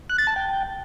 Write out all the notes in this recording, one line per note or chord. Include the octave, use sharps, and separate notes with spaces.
F#6
A6
A5
G5